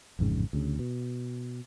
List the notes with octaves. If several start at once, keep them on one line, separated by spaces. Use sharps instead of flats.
A1 F2 G#2 C#3
D2 C#3
B2